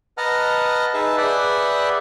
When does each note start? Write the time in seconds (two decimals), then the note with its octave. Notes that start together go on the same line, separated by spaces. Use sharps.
0.18 B4 D#5 F#5 A5 A#5 F6
0.94 D#4 G#4 B4 E5 A5
1.18 G#4 B4 D5 E5 F#5 G5